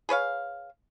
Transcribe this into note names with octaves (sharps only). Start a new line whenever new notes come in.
G#4 B4 C#5 F5